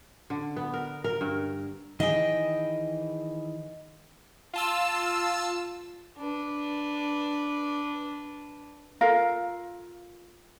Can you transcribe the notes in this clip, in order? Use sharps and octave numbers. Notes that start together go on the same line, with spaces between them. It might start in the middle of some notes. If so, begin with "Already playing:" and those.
D3
B3
A#4
A#4
G2
D#3 E3 G#4 D#5 G5
F4 A5 E6
D4 B4
F4 A4 A#4 F5